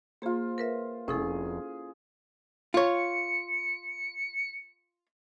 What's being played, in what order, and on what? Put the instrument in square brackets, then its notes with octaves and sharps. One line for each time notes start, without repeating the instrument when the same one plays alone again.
[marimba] A#3 G#4 [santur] F4 C5
[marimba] A#4 B4 E5
[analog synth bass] F1 [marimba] C#4 E4 A4 [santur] G#4
[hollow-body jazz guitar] F4 C#5 [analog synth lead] C#7